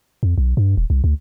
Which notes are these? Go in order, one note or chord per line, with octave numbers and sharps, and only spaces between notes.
F2
B1
G2
D#1
C2
D2